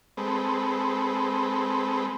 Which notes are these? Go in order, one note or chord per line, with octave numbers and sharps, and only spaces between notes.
G#3 C4 A4 B4